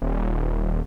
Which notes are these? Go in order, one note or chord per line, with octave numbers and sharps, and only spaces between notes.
D#1